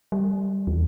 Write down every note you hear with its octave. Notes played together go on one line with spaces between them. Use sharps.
G3
E2